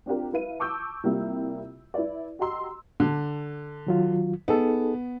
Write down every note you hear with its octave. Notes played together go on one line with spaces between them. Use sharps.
C4 D4 F4 G4 A#4
E4 B4 F5 D#7
A5 C#6 D6 E6 G6
C3 G3 A#3 E4 F4
E4 B4 D5
F#4 G4 D#5 A#5 C6 E6
D3
D#3 F#3 F4
B3 D#4 G#4 A4